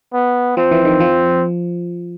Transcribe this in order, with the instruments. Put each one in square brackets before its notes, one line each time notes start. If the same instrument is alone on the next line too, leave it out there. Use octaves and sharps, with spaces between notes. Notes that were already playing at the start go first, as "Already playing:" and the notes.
[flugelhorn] B3
[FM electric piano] F3 [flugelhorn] C4
[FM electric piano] E3
D#3
F3